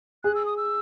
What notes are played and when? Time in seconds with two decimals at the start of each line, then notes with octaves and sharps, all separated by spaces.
0.24 G#4 F#6
0.35 E6
0.45 D#6
0.57 E6